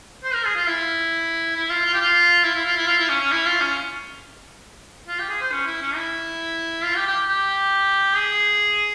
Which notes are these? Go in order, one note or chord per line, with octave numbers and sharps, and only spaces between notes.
C5
A#4
G#4
F4
E4
E4
F4
F4
G4
F4
E4
E4
F4
E4
F4
E4
C#4
C#4
E4
F4
C#4
F4
G4
G#4
C5
C#4
E4
C#4
E4
F4
G4
G4
G4
G#4